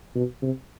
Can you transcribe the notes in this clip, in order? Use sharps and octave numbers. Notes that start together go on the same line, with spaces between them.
B2
C3